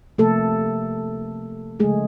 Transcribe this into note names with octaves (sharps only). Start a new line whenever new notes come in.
C3 F3 A3 A#3 A4
C#3 F3 G#3 A3 G#4